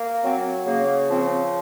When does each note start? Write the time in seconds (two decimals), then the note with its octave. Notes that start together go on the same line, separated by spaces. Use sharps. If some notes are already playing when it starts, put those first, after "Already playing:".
Already playing: A#3
0.23 F#3 C4
0.66 C#3 A#3
1.08 F3 C4